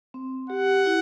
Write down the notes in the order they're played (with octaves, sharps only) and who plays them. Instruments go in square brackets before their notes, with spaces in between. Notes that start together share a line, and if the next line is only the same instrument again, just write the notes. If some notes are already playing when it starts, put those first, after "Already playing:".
[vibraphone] C4
[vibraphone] G4 [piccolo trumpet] F#5
[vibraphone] E4